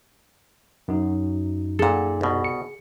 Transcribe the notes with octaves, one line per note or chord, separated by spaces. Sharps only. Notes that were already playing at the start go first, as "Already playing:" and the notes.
F#2 D#4
A#2 G#4 A4 F#5
C2 B2
C#7